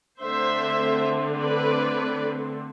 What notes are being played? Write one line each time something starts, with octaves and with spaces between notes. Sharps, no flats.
D3 A3 C4 C5 E5
B4 D5